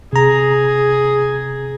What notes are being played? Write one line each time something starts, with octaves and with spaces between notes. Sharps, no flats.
C3 G#4 A#5